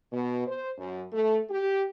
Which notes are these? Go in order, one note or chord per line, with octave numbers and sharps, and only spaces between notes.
B2
C5
F#2
A3
G4